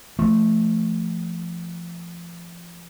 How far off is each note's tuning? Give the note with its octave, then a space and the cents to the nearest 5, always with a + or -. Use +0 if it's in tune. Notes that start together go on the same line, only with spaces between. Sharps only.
F3 -25 A3 +0